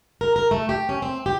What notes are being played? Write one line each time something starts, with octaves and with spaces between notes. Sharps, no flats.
A#4
A#4
A3
G4
C#4
C4
G4